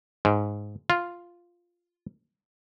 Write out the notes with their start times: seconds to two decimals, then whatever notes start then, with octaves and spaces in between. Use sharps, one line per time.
0.25 G#2
0.90 F4